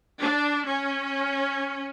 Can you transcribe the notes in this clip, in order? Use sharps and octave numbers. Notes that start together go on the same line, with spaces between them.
D4
C#4